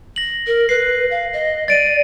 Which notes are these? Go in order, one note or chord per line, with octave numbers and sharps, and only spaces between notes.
A#6 F#7
A#4
B4 C7
F5
D#5
D5 A6 D7 D#7